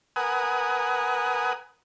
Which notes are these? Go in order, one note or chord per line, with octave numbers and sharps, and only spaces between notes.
A#4 B4 F#5 G#5 D#6